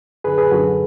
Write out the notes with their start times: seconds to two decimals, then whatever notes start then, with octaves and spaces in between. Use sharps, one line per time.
0.24 F#2 D3 G#4 B4
0.38 G#4 B4
0.52 F#2 D3 F#4 A4